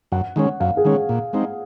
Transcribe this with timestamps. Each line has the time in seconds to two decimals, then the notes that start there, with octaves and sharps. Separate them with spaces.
0.12 F#2 F#5
0.36 D#3 G#3 C#4
0.60 F#2 F5
0.77 G#4
0.85 D#3 G#3 C#4
1.09 A#2
1.33 G#3 C4 D#4